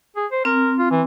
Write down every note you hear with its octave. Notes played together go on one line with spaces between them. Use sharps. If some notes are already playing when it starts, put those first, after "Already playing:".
G#4
C5
C4 A#4
F4
E3